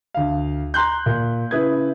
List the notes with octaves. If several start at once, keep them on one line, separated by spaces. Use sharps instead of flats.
D2 F5
A#5 C6 F#6 G6
A#2
C#3 E4 B4 D#6 G#6